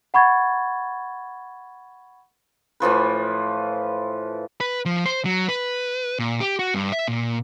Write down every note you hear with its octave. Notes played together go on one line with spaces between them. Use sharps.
F#5 B5 C#6 G#6 A6
A2 E3 F3 B4
B4
F3
C5
F#3
B4
A#2
G4
F#4
G2
E5
A#2